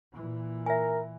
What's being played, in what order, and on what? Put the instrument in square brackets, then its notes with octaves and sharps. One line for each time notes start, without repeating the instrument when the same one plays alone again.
[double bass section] A#2 E3
[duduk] A#4 [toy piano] E5 G#5